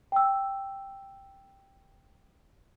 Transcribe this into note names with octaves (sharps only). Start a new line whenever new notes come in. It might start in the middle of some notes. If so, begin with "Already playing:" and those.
G5 E6